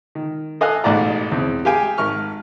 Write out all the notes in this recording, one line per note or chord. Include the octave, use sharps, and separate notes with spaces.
D#3
A4 D#5 F5 G#5 F6 F#6
A1 G#2 B2 D5 A#5
E2 C#3 C4
G4 G#4 F5 G5 G#5
G#1 C#6 F6